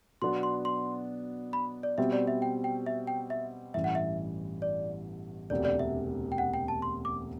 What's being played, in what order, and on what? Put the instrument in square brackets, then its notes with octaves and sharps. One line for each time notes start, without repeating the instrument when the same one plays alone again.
[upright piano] B2 F#3 B3 D4 [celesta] C6
[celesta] C6
C6
B5
D5
[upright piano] B2 G3 C4 [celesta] E5
[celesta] D5
E5
G5
G5
E5
G5
E5
[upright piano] A1 G2 E3 [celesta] E5
[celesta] F#5
E5
D5
[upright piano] E1 D2 C3 [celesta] D5
[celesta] D5
E5
G5
F#5
G5
A5
C6
D6